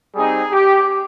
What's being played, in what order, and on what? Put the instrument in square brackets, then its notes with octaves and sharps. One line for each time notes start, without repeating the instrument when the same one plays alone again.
[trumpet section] G3 C4 D#4 G#4
G4